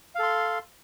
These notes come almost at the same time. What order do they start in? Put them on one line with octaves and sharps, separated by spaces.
F5 A4 C6